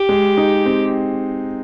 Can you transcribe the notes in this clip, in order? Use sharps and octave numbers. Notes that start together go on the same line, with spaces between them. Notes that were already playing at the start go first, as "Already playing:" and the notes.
Already playing: G4
G#3
D#4
C4